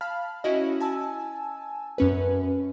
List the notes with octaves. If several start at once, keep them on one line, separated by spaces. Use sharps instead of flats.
F5 A5 B5 F6
C#4 E4 F#4 D#5
G#5 A5 E6
F#2 C#4 B4